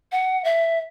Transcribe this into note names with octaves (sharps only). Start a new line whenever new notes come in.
F#5
E5